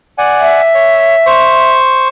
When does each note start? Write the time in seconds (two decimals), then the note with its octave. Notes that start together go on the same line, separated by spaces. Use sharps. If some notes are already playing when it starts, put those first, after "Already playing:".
0.18 D5 F#5 G#5
0.40 E5
0.75 C#5
1.26 C5 C#6